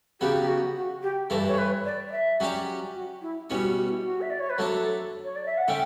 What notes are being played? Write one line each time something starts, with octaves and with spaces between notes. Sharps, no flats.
C#3 F#3 B3 G4
G4
F#4
F#4
G4
G2 E3 A3 A4
C#5
B4
D5
D5
E5
F#3 C#4 G4 D5
F#4
E4
B2 G3 C#4 E4
F#4
G4
E4
F#4
E5
D5
C#5
B4
F#3 A3 D4 A4
C#5
D5
E5
F#5
D3 A3 C#4 G5